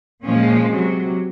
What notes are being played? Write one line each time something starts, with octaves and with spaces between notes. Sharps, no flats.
A#2 F3 G#3 C#4
C3 F#3